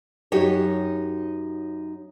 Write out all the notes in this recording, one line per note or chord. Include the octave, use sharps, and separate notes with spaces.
F#2 D#4 F#4 G4 C#5